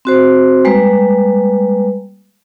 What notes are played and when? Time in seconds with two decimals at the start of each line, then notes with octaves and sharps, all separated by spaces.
0.05 C4 F#4 C5
0.65 G3 G#3 A#3 B4